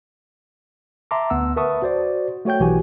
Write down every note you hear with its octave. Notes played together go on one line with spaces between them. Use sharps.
E5 A5 A#5 C6 D6
D2 B3 F#5 E6
A#4 B4 E5 A5 C#6 D#6
F#4 C5 D5
A3 F#4 C#5 G5 G6
B1 E3 F#4 G4 G#5